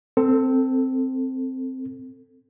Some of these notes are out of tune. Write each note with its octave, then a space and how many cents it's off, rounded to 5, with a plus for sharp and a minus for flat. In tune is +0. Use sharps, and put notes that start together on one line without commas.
C4 -5 A4 +20